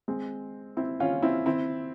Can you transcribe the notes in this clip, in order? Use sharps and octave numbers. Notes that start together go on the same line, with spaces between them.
G#3 C4
C4 E4
C#4 F4
C4 E4
C4 E4